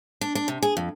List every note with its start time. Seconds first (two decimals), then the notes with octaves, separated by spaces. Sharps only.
0.21 D4
0.35 D4
0.48 C3
0.62 G#4
0.77 F2